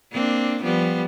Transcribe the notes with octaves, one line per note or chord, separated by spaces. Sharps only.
A#3 C4 D4
F3 G3 B3